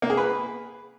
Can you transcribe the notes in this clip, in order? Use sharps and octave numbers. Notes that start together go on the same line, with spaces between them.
A#3
G#4
B4